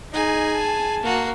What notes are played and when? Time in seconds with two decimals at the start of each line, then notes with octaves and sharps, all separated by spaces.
0.14 D#4 G#4 G#5
0.53 A5
1.03 A#3 F#4